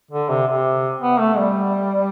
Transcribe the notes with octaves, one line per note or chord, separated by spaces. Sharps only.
D3
C3
C3
B3
A3
G3